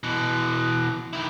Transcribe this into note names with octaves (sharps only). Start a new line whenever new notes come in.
B2 E3
D#3 E4